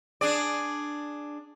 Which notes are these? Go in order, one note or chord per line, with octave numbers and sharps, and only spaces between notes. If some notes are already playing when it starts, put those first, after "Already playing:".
D4 G#4 D5